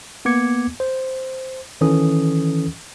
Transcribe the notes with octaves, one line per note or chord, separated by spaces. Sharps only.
A#3 B3 D6 G#6 C#7
C5
D#3 E3 C#4 A4 D#6